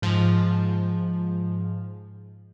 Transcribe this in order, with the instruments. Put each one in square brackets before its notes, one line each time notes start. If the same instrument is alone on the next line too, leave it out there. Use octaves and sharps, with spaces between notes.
[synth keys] G#2 F3